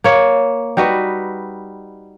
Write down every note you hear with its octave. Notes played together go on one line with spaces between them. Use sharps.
A#3 C#5
G3 D#4 F#4 B4